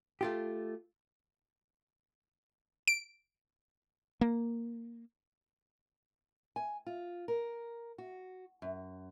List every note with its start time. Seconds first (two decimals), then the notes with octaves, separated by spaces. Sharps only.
0.21 A3 F4 G4
2.88 D7
4.21 A#3
6.56 G#5
6.86 F4
7.28 A#4
7.98 F#4
8.62 F#2